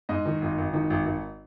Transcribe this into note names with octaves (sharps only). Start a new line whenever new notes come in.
G#2 D#5
D#3
G#1
G#1
D#3
G#1
G#1